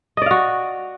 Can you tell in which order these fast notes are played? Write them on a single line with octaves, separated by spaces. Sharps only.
D#5 D5 F5 F#4